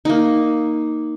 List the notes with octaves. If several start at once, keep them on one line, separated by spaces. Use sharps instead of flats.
A#3 D#4